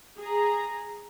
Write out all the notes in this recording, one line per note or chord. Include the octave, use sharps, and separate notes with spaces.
G#4 A#5